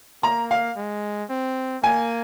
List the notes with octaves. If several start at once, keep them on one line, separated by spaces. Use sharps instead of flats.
A#3 A#5
F5
G#3
C4
A#3 G#5